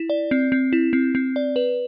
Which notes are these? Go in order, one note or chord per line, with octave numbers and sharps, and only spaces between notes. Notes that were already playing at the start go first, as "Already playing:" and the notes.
Already playing: E4
D5
C4
C4
E4
C4
C4
D5
B4